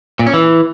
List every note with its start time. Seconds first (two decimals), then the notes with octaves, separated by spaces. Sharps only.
0.19 A#2
0.26 C#4
0.34 E3